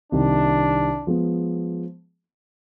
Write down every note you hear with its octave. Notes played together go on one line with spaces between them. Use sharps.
C2 C3 D#3 D4
F3 G#3 B3